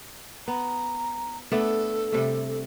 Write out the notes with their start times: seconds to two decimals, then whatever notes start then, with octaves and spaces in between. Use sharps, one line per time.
0.48 B3 A#5
1.52 A3 B3 D4 A4
2.12 C3 G3 A3